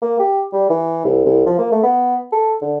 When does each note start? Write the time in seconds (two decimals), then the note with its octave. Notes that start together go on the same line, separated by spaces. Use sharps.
0.02 A#3
0.19 G4
0.52 G3
0.70 E3
1.05 C2
1.25 C2
1.46 F3
1.58 A#3
1.72 A3
1.83 B3
2.32 A4
2.61 D3